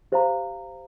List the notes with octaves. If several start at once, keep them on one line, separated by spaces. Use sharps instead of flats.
G4 C5 F5 A#5